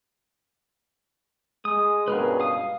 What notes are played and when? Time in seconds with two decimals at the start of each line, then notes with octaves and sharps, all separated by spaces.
1.65 G#3 D#6
2.08 C#2 G2 B2 G#4 A#4 B4
2.40 F5 D#6